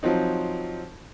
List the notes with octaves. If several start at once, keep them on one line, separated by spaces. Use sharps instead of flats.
F3 F#3 C4 D#4